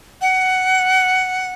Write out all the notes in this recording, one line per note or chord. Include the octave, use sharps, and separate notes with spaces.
F#5